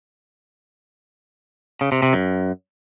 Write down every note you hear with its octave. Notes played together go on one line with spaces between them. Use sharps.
C#3
C3
C3
F#2